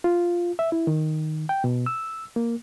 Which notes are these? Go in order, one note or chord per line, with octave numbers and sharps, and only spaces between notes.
F4
E5
E4
D#3
G5
B2
E6
A#3